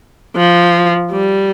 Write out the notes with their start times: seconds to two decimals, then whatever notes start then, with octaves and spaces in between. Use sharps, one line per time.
0.36 F3
1.11 G3